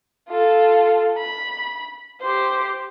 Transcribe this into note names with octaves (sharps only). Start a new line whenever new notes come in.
F4 A4
B5
G4 C5